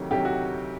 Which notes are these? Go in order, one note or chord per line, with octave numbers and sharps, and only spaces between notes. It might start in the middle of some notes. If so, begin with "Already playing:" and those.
Already playing: D2 C3 D#3 F#3 G4
D2 C3 D#3 F#3 G4
F#4